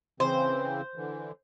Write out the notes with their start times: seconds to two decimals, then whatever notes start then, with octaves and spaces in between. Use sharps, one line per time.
0.20 C#3 E3 C4 C5
0.96 D3 E3